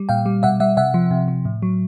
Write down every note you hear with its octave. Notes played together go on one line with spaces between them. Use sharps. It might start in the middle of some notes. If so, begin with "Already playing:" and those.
Already playing: G3
A#2 F5 G5
G3
B2 E5 F#5
G3 E5 F#5
C3 E5 F#5
F3
C3
F3
A2
F#3